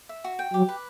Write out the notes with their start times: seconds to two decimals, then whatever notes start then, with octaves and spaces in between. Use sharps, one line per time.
0.09 E5
0.24 F#4
0.39 G5
0.53 F#3 G4
0.68 B4